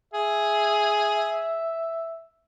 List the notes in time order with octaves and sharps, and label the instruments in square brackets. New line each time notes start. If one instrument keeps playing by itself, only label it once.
[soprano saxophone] G#4 [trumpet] E5